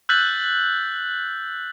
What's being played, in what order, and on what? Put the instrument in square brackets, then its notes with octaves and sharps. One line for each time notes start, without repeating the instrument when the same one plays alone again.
[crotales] E6 F#6 G6 A6 B6 F#7